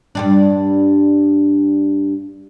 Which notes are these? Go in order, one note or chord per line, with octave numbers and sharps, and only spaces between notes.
G2 G3 D4